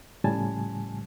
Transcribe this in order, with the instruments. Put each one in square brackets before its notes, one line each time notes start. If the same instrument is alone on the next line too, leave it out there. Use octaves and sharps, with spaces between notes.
[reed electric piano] A2 C#3 F3 G3 G#5 A5